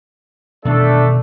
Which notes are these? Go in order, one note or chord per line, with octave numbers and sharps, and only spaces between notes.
B2 D#3 E3 A3 D4 A4